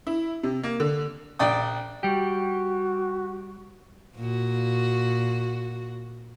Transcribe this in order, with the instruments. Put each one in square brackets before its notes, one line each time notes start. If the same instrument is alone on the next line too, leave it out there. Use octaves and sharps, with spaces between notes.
[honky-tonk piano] E4
C3
A#3
D3
[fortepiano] A#1 D5 G5 D#6
[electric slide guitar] G3 G4 [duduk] F#4
[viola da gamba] A#2 F#4